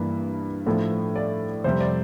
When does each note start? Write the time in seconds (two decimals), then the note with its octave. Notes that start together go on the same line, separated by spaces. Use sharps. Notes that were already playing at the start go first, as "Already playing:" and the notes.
Already playing: G2 E3 A#3 D4
0.66 A2 F3 A3 D4
1.15 D5
1.64 F2 C3 G3 C5
1.80 D5